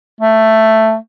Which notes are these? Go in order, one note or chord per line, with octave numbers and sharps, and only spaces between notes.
A3